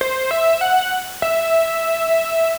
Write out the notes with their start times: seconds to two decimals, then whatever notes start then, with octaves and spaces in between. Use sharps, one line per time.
0.01 C5
0.31 E5
0.61 F#5
1.22 E5